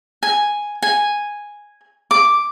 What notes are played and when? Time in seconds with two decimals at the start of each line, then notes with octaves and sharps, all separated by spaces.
0.23 G#5
0.82 G#5
2.11 D6